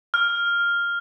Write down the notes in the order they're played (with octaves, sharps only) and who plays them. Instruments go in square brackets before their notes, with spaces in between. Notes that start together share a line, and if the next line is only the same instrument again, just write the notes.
[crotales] F6